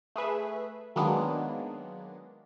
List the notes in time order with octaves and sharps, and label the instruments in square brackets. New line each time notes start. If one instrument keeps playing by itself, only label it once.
[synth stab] A3 G#4 B4 E5
D#3 F#3 G#3 A#3 B3 D4